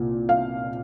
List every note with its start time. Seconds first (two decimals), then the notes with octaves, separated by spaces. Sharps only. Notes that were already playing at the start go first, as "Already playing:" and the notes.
Already playing: C2 A#2 A#3
0.29 F5